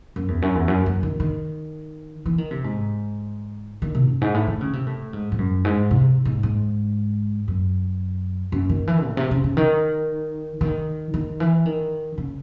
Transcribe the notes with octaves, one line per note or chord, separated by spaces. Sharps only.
F#2
E2
F#2
E2
F#2
F#2
D#3
D#3
E3
D#3
C3
G#2
D#3
C3
F#2
G#2
A2
D#3
C#3
C3
A2
G#2
G#2
F#2
G#2
C3
G#2
G#2
F#2
F#2
D#3
E3
A2
C3
C#3
C#3
D#3
D#3
D#3
E3
D#3
C#3